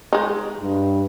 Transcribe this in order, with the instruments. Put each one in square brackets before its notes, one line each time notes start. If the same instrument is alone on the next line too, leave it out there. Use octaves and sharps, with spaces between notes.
[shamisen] G#3 D#4
[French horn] G2